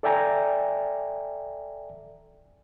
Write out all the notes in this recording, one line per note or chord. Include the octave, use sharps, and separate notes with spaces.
A4 D5 E5 G5 G#5 A#5